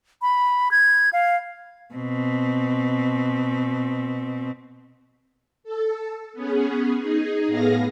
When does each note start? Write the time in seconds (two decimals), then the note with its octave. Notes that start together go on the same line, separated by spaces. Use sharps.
0.22 B5
0.71 G#6
1.13 F5
1.94 B2 C4
5.64 A4
6.34 B3 C#4 G#4
6.99 D#4 G#4
7.48 A2 B3 G#4 F5 A#6